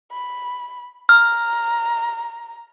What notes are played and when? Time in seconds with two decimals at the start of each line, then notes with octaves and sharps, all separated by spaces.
0.12 B5
1.09 A#5 F6